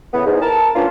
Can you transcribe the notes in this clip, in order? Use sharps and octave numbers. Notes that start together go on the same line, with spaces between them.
A2 C#3 E3 B3
E2 G#2
A#4 A5
A#3 B3 C#4 D4 F4